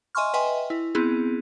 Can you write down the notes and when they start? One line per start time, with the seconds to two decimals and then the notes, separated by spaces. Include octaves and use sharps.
0.15 D#5 E5 G#5 C6 C#6 F6
0.34 B4 D#5 E5 G5 G#5 C6
0.70 E4
0.95 B3 C4 E4 G#4